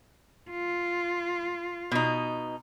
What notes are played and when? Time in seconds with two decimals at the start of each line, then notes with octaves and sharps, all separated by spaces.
0.51 F4
1.92 B2 D#4